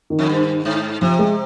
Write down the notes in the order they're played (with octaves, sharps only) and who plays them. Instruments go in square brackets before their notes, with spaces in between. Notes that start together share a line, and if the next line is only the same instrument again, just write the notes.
[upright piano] D#3
[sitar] F2
G2
G#2
[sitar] C3 [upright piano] F3
[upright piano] G#3